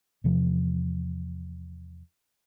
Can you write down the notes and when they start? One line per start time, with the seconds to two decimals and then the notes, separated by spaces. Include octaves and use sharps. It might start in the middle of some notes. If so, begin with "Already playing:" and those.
0.24 E2 C3 F3